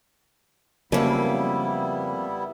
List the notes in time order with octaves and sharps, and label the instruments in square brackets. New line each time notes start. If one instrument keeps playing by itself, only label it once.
[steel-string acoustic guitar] F2 A#3 [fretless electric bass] C#3 F#3 C#4 [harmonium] G3 B3 E4